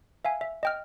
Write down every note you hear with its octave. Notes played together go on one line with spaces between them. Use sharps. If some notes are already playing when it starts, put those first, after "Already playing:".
E5 F5 G#5
E5
D#5 G5 F6